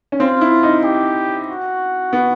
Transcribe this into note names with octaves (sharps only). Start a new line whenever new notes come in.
C#4
C4 F4
E4
D#4
G4
F#4
B3